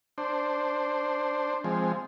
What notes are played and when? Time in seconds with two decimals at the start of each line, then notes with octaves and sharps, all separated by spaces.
0.18 D4 C5
1.64 F3 G#3 C4